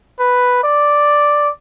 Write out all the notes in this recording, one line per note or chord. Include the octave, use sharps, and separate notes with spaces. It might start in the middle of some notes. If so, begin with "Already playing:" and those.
B4
D5